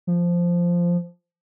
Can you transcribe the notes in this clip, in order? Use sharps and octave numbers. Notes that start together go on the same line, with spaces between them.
F3